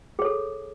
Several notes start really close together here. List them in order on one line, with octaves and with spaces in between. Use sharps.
G#4 C#5 A4